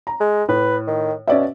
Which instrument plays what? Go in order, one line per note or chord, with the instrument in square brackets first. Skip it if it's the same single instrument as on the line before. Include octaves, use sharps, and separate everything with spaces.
[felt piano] A#5
[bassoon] G#3
[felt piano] A2 [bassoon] B4
[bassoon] D#3
[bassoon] B2 [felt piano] C#4 D5 E5